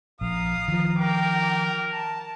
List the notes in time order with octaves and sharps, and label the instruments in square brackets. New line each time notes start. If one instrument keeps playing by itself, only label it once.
[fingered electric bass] A#1 [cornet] F5 [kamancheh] A#5 D#6
[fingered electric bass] D#3 F3
[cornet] A#4 [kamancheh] G5 D6
[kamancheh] A5